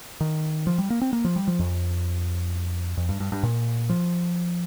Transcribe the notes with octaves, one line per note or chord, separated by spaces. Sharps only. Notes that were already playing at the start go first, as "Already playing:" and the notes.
D#3
F3
G3
A#3
C4
A#3
F3
G3
F3
F2
F2
G2
G2
G2
A#2
F3